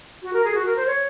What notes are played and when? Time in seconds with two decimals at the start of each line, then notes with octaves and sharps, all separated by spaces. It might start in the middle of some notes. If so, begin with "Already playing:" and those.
0.23 F#4
0.33 A#4
0.45 G#4
0.54 F#4
0.66 A#4
0.76 C5
0.87 C#5